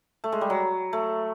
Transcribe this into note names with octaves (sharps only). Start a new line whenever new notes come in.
A3
G#3
G3
F#3
A3